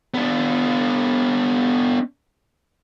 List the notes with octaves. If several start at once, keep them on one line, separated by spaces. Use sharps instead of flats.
B3 D4